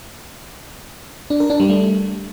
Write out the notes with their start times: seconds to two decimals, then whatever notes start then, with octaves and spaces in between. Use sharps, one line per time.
1.30 D4
1.40 A#4
1.50 D4
1.60 G3
1.69 A3